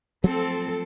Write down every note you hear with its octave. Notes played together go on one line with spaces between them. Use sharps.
F3 F#3 A3 C4 A4